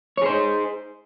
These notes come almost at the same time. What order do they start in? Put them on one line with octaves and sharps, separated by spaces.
C#5 G#4 C5 D#4